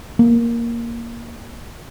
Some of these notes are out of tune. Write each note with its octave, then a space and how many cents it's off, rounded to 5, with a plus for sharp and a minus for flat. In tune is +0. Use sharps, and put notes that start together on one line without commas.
A#3 +5